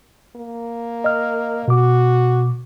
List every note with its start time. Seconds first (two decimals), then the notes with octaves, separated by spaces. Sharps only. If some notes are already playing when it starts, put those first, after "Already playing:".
0.36 A#3
1.04 D#5 F6
1.68 B2 F#4 D6